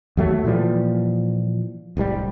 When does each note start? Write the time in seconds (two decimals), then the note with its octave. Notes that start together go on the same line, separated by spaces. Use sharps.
0.17 D#2 F#3 A3
0.44 A#2 E3 F3 G3
1.97 D1 C2 A#2 G3